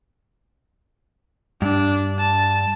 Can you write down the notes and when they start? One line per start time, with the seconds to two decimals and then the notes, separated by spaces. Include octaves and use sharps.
1.62 G2 D4
2.20 A5